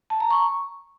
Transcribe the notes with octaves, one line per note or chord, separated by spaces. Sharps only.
A5
A#5
C#6